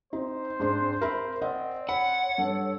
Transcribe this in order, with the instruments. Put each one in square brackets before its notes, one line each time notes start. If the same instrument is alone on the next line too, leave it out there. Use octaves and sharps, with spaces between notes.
[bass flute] C4 [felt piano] D#4 [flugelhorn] C5
[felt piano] G#2 D4 C6
A#4 E5 B5
[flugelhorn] C4 [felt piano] C5 D#5 F#5 [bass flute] D5
[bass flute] C#5 [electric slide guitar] F#5 [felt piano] B5
[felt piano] G2 [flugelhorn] A4